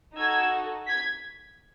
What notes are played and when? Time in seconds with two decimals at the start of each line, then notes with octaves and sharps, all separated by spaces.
0.16 D#4 F#4 A4 E6 G#6
0.88 G#6 B6